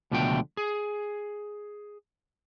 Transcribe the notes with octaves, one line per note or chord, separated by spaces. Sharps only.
C#2 B2 D3 F3 A3 G5
G#4